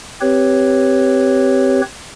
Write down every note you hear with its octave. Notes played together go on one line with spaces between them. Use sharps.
C4 G4 B4 C#5